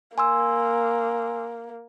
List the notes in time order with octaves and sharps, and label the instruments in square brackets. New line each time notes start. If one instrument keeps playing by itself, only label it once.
[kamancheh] A#3 [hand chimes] G#5 C6 E6